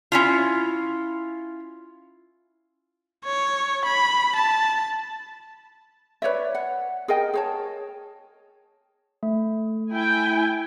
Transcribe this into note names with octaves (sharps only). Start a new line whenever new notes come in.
C#4 E4 F4
C#5
B5
A5
B4 C#5 D5 E5
F#5
G#4 A#4 D#5 G5
G#4 C#5 A5
A3
E4 G5 G#5